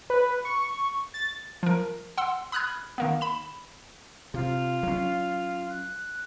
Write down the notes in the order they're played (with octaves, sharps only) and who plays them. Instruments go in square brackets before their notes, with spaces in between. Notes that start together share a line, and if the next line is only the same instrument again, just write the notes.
[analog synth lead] B4
C#6
A6
[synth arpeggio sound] F3 A#4
F#5 C6 E6
B5 D#6 F6 F#6 G#6
D#3 A#3 B3
B5 E7
[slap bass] C3 [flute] F4
[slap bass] F#3 C#4
[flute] F#6